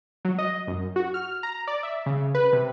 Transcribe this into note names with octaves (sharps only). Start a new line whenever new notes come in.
F#3
D#5
F#2
F#4
F6
A#5
D5
E5
C#3
B4
C3